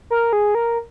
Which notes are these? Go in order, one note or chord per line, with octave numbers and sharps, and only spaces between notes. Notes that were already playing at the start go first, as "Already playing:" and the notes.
A#4
G#4
A#4